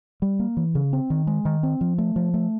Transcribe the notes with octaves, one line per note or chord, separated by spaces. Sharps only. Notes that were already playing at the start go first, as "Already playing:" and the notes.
G3
A#3
E3
C#3
C4
D#3
G#3
D#3
C4
F3
A3
F3
A3